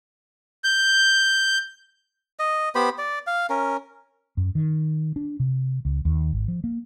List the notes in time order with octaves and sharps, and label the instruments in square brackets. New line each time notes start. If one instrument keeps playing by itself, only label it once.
[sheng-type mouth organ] G6
[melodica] D#5
B3 G4 C5 B5
D5
F5
C#4 A#4
[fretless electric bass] F#2
D#3
D4
C3
C#2
D#2
G#1
F3
A#3